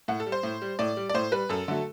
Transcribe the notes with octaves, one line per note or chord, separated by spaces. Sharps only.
A2 F#5
A4
G3
C5
A2
G3
A2 D5
G3
D5
A2 C5
G3 B4
F#2 A4
D3 F#3 A3